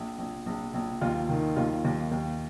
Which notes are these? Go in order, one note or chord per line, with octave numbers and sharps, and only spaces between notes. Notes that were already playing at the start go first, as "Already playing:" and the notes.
Already playing: A#1
A#1
A#1
A#1
D#2 F4
D#3
D#2 F4
D#2
D#2